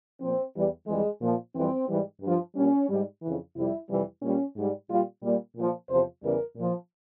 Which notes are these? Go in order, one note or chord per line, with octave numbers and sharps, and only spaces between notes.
A#2 F3 C4
E2 E3 G3
F2 E3 G3 G#3
A#2 F3
F2 E3 G3 C4
G#2 E3 G3
G2 F3
A#2 G3 C#4
G#2 G3
F2 C#3 E3
F2 C3 G3 E4
F2 C3 E3 G3
A#2 G3 C#4
G#2 G3
A#2 G3 F4
A#2 G3
A#2 F3
E2 C3 F3 C5
E2 C#3 E3 G3 A#4
A#2
F3